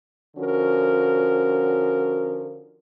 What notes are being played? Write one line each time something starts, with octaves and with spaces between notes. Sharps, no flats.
D3 F3 C#4 F#4 A#4